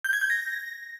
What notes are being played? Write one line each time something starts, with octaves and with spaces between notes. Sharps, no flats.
G6
G#6
G6
A#6